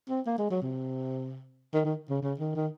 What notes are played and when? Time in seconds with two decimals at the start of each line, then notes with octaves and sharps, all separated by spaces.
0.09 C4
0.26 A#3
0.38 G#3
0.50 F#3
0.62 C3
1.74 D#3
1.85 D#3
2.09 C#3
2.22 C#3
2.39 D#3
2.55 D#3